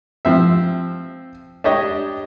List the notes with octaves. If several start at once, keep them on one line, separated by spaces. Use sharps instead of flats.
F3 C4 E5
D4 G4 C#5 D#5